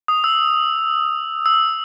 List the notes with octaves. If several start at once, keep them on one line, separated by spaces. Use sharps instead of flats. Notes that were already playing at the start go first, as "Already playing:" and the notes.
D#6
E6
E6